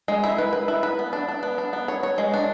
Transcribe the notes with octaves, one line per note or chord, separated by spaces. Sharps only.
G#3
E4
B4
B4
E4
B4
B3
D4
D4
B3
D4
B3
C#5
C#5
G#3
D4